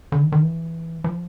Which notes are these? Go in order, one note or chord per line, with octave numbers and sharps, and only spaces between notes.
D3
D#3
D#3
E3
F3